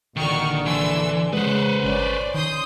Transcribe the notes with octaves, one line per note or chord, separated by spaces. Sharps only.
A#1 D3 D#3 F#4 C#6 F6
E3 A4 C6 E6
C#3 G#3 B4 C5 F#5
G1 C#4 D5
D#3 C6 D#6 G6